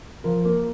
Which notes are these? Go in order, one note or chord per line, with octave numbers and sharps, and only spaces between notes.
F3 A#4
A#3